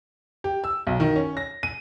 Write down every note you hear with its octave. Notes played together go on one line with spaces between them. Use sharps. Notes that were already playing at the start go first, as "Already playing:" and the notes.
G4
E6
B1
D#3
C#4
A#6
D#7